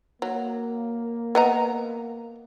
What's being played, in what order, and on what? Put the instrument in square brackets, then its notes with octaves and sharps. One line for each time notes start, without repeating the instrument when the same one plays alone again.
[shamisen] F#3 [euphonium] A#3
[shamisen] B3 D#5 A#5